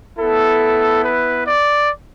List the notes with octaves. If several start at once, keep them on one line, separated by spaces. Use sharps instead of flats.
B3 E4 A4
B4
D5